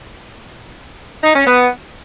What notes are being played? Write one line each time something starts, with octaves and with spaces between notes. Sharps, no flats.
D#4
C#4
B3